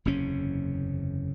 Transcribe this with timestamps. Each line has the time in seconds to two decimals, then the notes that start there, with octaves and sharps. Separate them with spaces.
0.05 F#1 E2 C3 C#4